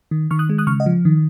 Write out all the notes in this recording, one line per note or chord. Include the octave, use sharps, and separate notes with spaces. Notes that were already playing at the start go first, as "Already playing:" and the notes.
D#3
D#3 C#6 F6
D#6 F#6
G#3
D#6 F#6
C#3 C#6 F6
D#5 F#5
F3
D#3